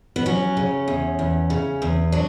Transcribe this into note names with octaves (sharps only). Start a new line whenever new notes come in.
B3
F#3 C#4
C#3
E2
E2
C#3
E2
F#3 D4